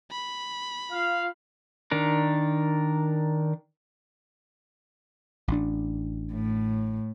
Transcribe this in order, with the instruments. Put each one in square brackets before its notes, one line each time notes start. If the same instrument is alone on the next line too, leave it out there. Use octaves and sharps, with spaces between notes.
[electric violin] B5
[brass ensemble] F4 F5
[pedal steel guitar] D#3 D4 A#4
[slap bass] A1 D4
[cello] A2